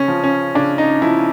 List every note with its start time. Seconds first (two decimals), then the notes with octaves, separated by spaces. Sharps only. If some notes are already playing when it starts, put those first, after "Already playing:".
Already playing: C#3 C#4
0.08 F3
0.24 C#4
0.55 C#3 D4
0.78 D#4
1.02 F3 E4